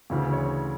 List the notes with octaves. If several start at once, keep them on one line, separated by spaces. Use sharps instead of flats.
D2 C#3 E3
C#5